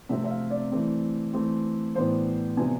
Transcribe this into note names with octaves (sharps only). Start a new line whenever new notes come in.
C3 F3 A3 C4 E5
E5
F5
D5
E3 A3 C4
E3 A3 C4
A2 E3 B3 D4 C5
C3 F3 B3 D4 G#5